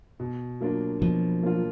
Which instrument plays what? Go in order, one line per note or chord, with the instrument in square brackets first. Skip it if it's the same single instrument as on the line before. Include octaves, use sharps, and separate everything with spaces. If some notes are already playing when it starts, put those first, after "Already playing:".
[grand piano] B2
F#3 A#3 D4 F4
[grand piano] B2 [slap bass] F3
[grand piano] F#3 A#3 D4 F4